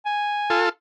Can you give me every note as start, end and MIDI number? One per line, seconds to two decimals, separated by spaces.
0.06 0.64 80
0.50 0.69 65
0.50 0.69 69